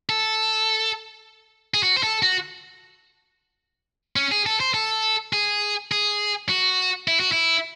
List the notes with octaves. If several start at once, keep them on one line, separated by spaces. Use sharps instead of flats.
A4
G#4
F#4
C5
A4
F#4
C#4
G#4
A4
C5
A4
G#4
G#4
F#4
E4
F#4
E4